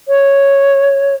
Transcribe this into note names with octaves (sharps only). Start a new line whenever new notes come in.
C#5